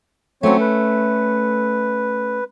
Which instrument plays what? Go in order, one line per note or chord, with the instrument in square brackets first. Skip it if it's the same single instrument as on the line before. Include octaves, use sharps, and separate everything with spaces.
[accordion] F#3 C4 C#5 [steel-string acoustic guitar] A3 C#4
[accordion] B4